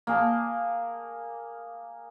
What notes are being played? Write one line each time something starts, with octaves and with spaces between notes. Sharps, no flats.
A#3 G#4 A5